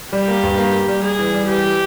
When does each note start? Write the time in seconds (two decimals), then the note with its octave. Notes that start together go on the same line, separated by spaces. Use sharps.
0.13 G3 G4
0.28 A#3
0.43 G2
0.58 A#3
0.73 A#3
0.88 G3
1.03 G3 G#4
1.19 E3
1.34 G3
1.48 E3 G4
1.64 E3